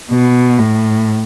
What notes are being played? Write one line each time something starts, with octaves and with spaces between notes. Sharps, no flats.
B2
A2